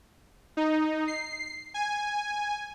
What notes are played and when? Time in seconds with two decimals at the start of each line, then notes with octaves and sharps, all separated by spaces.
0.57 D#4
1.08 C7
1.74 G#5